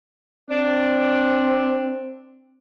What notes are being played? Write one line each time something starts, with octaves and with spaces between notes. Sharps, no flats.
C4 D4